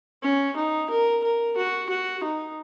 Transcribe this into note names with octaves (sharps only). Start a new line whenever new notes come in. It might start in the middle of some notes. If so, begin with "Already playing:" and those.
C#4
D#4
A#4
A#4
F#4
F#4
D#4